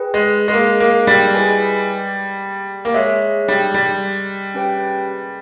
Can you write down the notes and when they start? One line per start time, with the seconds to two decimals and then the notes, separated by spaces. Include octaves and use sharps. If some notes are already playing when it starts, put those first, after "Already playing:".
Already playing: G#4 B4 G5
0.14 G#3
0.48 G#3
0.53 A#3
0.80 A#3
1.07 G3
1.34 E4 G#4 B4 D#5 G#5
2.85 A#3
2.94 G#3 G#4 C#5 E5
3.48 G3
3.74 G3
4.54 C#4 G4 B4 G5